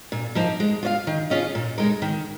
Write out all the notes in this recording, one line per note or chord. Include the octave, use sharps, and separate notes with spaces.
A#2
F3 A#3 D#4
G#3
F4 C#5 F5
D#3
C#4 F4 G#4 D#5
A#2
G#3 D#4 A#4
D#3